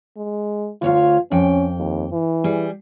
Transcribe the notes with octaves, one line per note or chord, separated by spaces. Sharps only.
G#3
D2 F4 C#5 F5
F2 C#4 G5
D#2
E3
G3 G#4